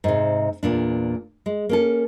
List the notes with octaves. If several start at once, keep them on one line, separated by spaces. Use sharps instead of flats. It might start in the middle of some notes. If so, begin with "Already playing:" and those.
G#2 C3
E2 A#2 D4
G#3
A#3 C#4 A4